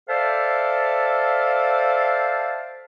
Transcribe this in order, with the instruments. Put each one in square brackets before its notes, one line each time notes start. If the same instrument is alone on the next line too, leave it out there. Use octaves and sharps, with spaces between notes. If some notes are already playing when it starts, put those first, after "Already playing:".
[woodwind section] A4 C5 D5 E5 F5 A5